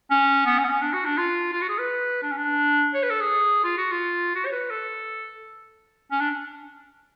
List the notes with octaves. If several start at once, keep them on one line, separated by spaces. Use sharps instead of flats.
C#4
B3
C#4
B3
C#4
D4
F#4
D4
F4
F4
F#4
G#4
B4
D4
C#4
D4
C#5
B4
A4
G#4
F4
F#4
F4
F#4
C#5
B4
A4
C#4
D4